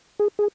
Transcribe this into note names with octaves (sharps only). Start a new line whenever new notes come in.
G#4
G#4